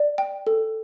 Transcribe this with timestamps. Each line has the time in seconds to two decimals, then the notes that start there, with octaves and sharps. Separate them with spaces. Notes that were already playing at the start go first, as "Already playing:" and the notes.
Already playing: D5
0.18 G5
0.47 A4